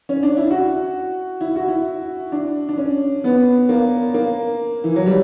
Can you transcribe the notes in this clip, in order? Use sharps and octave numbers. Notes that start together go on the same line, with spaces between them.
C#4
D4
E4
F#4
E4
F#4
E4
D4
D4
C#4
B3
A#3
A#3
E3
F#3
G3